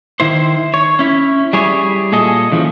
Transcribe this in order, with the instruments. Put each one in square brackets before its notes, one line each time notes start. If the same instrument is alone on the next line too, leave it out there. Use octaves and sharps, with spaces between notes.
[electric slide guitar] D#3 E4 C5
C#5
C#4 E4
G3 E4 G#4 C#5
A#2 G#4 A4 D#5
C#3 E3 F3